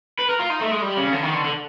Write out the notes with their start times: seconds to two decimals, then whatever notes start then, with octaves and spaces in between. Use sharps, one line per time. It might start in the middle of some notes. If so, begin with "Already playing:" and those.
0.19 B4
0.29 A#4
0.39 F4
0.50 D#4
0.61 A3
0.71 G#3
0.82 G3
0.97 C#3
1.13 D3
1.23 D#3
1.34 D3
1.45 D3